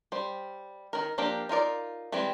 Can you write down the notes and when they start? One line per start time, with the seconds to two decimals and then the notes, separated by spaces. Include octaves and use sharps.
0.12 G3 C5
0.93 D#3 A#4
1.18 F3 A#3 D4 G4 A#4
1.49 D#4 F4 A#4 D5
2.12 E3 G3 G#3 C4